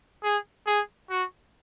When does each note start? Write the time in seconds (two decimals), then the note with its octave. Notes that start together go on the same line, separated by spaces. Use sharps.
0.24 G#4
0.67 G#4
1.10 F#4